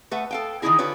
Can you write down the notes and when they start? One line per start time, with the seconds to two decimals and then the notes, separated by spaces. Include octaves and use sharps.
0.11 A3 B4 E5 F#5
0.31 A4 F5 G5
0.62 D#3 E3 A#3 D#4 E4 G#4
0.79 D3 F4 G4 B4 C#5